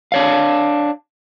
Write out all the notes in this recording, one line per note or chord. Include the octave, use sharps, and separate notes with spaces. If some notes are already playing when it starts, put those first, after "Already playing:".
D4 C#5 F5